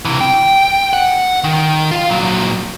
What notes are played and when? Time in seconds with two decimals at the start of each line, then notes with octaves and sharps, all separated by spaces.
0.05 C3 E3
0.21 G5
0.93 F#5
1.44 D#3
1.91 F4 F5
2.09 A#2 F#3